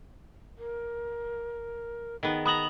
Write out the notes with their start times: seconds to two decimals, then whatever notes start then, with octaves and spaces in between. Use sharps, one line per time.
0.58 A#4
2.23 D#3 B3 G#4
2.45 B3 A#5 B5 D#6 F#7